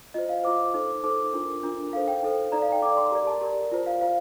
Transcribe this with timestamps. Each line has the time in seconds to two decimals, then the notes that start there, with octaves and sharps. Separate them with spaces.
0.14 F4 C5 D#5
0.29 F5
0.43 F4 C5 D6
0.74 D#4 A4 C5
1.04 D#4 A4 C5 D6
1.33 D4 F4 A#4
1.63 D4 F4 A#4
1.92 D#4 A4 C5 F5
2.08 G5
2.23 D#4 A4 C5
2.52 D#4 A4 D5 A#5
2.62 F5
2.72 G5
2.82 D#4 A4 D5 D6
2.97 C6
3.11 G4 A#4 D5 A#5
3.27 A5
3.41 G4 A#4 D5
3.72 F4 C5
3.86 F5
4.01 F4 C5 F5